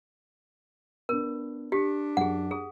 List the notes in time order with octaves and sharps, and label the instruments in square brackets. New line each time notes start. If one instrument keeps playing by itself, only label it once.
[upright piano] B3 D4 [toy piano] A#4
[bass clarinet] D4 [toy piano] G4 [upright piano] B6 C#7
[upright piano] F#2 [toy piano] G#4 F#5
[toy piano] G#4 [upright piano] D#6